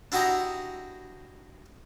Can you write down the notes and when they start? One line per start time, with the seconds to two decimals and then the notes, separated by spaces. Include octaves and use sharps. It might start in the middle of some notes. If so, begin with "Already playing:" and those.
0.12 D4 E4 F#4 G4 D#5 A#5